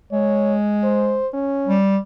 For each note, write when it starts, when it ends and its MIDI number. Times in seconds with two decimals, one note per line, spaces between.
0.12 1.21 56
0.12 0.55 73
0.84 1.28 72
1.34 1.78 61
1.67 1.97 55